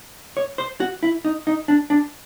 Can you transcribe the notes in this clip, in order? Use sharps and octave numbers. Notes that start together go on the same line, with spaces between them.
C#5
C5
F#4
E4
D#4
D#4
D4
D4